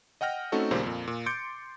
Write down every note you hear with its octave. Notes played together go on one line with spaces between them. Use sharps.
D#5 F#5 G5 F6 A#6
A3 C4 C#4 D#4 F#4 A4
D#2 A#2 C#3 G3 A#3 C5
F2 A#2
A#2
C6 D6 G6 A6 C#7 D7